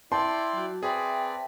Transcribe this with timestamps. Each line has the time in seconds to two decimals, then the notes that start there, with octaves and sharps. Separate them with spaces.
0.12 E4 D5 G5 A5 C6
0.53 F#3 F#4
0.83 C4 G#4 B4 D5 E5 G5